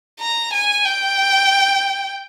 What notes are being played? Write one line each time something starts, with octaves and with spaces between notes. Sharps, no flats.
A#5
G#5
G5